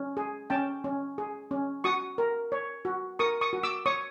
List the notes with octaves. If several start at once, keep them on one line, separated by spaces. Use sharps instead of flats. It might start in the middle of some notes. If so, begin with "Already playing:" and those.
Already playing: C#4
G#4
C#4 G5 A5
C#4
G#4
C#4
F#4 C#6 D#6
A#4
C#5
F#4
A#4 C#6 D#6
C#6 D#6
F#4
D6 E6
C#5 C#6 D#6